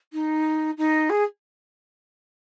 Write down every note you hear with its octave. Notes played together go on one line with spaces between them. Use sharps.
D#4
D#4
G#4